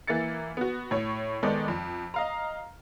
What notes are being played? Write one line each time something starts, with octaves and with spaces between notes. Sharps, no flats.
E3 A#3 E4 A6 C#7
B3 F#4
A2 C#5
D#3 G#3 B3 A4 D5
F2
D#5 F5 A#5